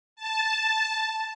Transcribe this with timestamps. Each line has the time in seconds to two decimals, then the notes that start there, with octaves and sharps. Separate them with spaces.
0.16 A5